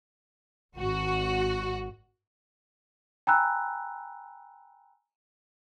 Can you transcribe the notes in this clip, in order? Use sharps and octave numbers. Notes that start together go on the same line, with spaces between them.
G#1 F#4
G5 G#5 A#5 B5 E6 F#6